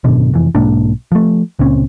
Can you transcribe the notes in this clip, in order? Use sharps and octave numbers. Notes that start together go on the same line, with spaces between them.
G#1 F#2 B2 D3
F1 F2 E3
B1 G#2 A#3 D4
F3 A3
C#2 A#2 C4 C#4